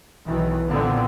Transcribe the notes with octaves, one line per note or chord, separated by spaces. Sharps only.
B1 B2 D#3 E3
A#2 D3 E3 B3 C4